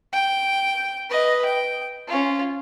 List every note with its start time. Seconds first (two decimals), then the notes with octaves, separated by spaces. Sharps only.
0.12 G5
1.09 B4 D#5
1.45 G5
2.08 C#4 F4